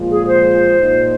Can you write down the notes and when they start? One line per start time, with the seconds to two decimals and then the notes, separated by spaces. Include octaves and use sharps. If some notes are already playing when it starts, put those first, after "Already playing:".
Already playing: A#2 F3 G#3 F4
0.10 G#4
0.27 C5
0.79 A#2 A#3 D#4